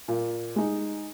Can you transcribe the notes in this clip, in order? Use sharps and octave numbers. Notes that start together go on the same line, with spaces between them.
A#2
G#3 D#4